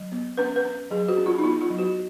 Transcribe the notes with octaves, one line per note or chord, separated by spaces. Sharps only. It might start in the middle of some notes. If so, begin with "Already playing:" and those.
Already playing: F#3
B3
C#4 B4
B4
C#4
F#3 G#4
F#4
C#4
F4
D#4
B3 F4
F4
F#3
F#4